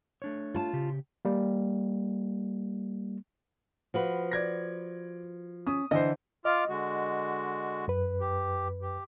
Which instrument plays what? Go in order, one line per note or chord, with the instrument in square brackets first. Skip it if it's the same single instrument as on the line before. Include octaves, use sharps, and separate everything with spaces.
[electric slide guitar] A3 D4 C#5
[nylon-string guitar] F4 A5
[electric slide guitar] C#3 G4
[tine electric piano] G3 A#3
[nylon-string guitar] F3 F#4 B4
[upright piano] D5 G#6 A#6
[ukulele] C#4 [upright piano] D#6
[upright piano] D3 E3 C5 [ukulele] D#5
[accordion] F4 D6 F6 [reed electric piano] D#5
[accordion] D3 G#3 F#4
[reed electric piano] F#2 B4
[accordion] G4
G4